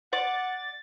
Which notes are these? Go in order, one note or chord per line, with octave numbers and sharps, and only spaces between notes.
D5 F#5 A6